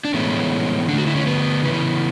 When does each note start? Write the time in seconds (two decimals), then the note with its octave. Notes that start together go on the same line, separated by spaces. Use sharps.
0.05 D4
0.14 A2 E3 G#3 B3 C#4
0.88 D3 D4
0.93 A3
0.98 F#4
1.06 E4
1.15 C#4
1.26 B3
1.62 C#3 E3 B3